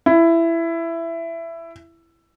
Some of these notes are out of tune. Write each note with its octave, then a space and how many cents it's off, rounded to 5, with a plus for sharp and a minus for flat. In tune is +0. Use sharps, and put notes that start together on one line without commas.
E4 +15